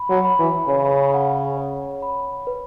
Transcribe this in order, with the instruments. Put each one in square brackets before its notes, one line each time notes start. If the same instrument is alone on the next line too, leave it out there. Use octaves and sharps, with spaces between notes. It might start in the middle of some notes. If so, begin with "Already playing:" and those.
Already playing: [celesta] B5
[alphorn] F#3
[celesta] B5
[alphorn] E3
[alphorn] C#3 [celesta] C#5
[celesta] F#5
C#5
B5
B4